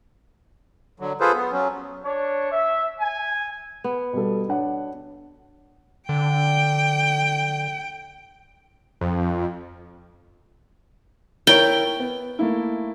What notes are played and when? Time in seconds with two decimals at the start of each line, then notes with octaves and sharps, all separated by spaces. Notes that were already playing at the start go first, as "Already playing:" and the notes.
1.00 D3 F#3
1.20 F4 G#4 A4 B4 C5
1.34 B3
1.52 F#3 C#4
2.04 D4 C#5
2.51 E5
3.00 G#5
3.84 B3
4.13 B2 G3 A4
4.49 D4 C#5 F#5
6.09 D3 G5
9.01 F2
11.47 E4 A#4 C#5 G5
11.99 B3
12.39 A3 A#3 E4